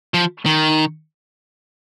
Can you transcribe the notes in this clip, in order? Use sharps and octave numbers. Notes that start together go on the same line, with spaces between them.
F3
D#3